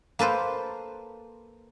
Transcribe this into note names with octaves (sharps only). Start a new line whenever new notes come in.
A#3 A4 B4 C5